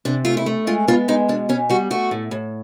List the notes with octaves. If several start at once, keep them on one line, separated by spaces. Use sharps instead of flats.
C3 D4
A3 F4
E4
A3
G#3 F4
B3 F4
G#3 D#4
B2 D4
B2 C#4
G3 F#4
A3 F#4
A2
A2